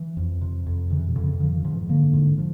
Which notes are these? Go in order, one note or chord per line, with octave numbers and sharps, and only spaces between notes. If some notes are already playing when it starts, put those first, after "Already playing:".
Already playing: E3
F2
C3
F2
C#3 E3
B2
F2
C#3
D3 F3
D#3
G#2
E3
D3 A#3
G#2
F3